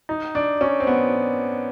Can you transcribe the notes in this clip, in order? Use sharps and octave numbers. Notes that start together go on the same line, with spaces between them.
D#4
D4
C#4
C4
B3